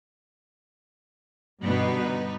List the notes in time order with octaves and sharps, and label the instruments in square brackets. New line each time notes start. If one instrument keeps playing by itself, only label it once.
[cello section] G2 B2 D3 [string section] G3 B3 D#4